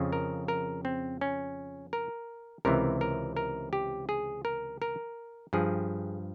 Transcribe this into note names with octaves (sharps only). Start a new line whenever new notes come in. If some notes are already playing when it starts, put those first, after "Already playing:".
Already playing: F2 C#3 F3
A#4
A#4
C4
C#4
A#4
C#2 C3 E3 A#4
A#4
A#4
G4
G#4
A#4
A#4
G2 F3 G#4